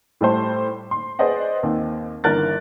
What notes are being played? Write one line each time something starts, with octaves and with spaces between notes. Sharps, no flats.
A2 G3 A3 C5
C6
G#4 B4 C5 D5 D#5 F#5
D#2 A#3 C4
G1 D#3 E3 A#4 F#6 A6